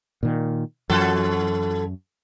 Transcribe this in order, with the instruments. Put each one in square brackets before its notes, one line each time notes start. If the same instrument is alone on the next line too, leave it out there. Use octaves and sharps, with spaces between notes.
[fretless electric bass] A#2 D#3
[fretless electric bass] F#2 [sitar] E3 F#4 A4